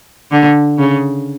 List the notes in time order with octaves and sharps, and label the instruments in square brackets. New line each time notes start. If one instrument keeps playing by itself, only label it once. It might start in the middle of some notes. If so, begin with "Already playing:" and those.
[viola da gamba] D3
C#3